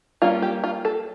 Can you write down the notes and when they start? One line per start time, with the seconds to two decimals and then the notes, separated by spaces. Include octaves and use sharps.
0.22 G3 A#3 C#4 F4
0.42 G4
0.64 F4
0.85 A4